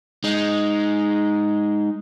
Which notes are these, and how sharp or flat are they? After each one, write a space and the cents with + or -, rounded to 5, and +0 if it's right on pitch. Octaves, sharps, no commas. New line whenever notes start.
G#3 +0 D#4 +0